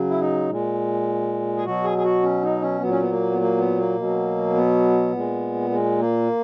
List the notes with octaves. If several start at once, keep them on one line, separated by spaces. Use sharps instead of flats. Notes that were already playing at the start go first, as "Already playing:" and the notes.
Already playing: C#3 F#3
E4
D#4
A#2 G#3
G#4
B2 F#3 F#4
G#4
G#4
F#4
C#4
D#4
C#4
A#2 F#3 B3
C#4
B3
A#3
B3
A#3
B3
A#3
B2 F#3
B3
A#2 G#3
G#3
A#3